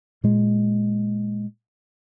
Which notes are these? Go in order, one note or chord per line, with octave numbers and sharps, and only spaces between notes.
A#2 G#3